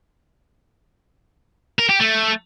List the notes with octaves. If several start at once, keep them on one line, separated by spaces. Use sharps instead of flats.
A#4
G4
A3